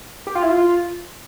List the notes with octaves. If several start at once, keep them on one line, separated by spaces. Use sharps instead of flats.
G4
F4
E4
F4